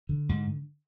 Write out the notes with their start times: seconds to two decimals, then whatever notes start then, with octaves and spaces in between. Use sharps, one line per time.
0.09 D3
0.29 G#2